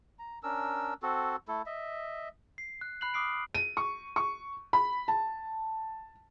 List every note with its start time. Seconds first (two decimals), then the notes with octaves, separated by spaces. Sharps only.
0.19 A#5
0.43 C#4 D4 A#4 E6
1.03 C4 F#4 A4
1.48 A3 E4 A4
1.66 D#5 E5
2.58 C7
2.81 F#6
3.01 B5 F#6 C7 F#7
3.14 D6 D#6 F6 C7 D7
3.55 D#7
3.77 C#6
4.16 C#6
4.73 B5
5.08 A5